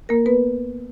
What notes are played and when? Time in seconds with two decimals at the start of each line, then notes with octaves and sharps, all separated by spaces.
0.09 A#3 A#4
0.26 B3 B4